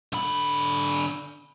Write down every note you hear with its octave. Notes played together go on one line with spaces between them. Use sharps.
D3 B5